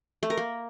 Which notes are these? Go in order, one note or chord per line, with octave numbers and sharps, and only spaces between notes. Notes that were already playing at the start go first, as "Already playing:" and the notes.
A3
A#4
A#3